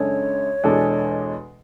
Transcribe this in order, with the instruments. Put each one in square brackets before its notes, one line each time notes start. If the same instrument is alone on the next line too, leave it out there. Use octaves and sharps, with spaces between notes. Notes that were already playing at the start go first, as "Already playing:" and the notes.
Already playing: [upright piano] F#2 C#3 G#3 D4 A4 [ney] C#5
[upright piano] E2 B2 G#3 D4 A4